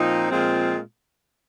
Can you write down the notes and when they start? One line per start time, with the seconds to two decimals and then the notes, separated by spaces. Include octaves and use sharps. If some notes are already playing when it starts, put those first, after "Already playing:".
Already playing: A#2 F3 C4 D#4
0.30 A#2 F3 G#3 C4 F4